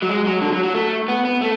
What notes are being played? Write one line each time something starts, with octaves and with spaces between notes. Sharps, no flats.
F#3
G#3
F#3
D3
F#3
F#3
A3
B3
B3
A3